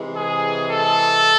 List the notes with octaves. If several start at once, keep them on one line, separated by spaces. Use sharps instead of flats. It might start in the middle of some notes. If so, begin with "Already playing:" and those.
Already playing: C3 E3 G#3
G#4
A4